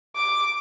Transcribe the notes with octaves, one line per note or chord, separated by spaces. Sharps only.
D6